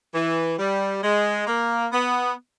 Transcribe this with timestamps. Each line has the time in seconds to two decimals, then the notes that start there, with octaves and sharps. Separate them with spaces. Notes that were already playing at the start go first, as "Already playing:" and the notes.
0.15 E3
0.59 G3
1.03 G#3
1.47 A#3
1.92 B3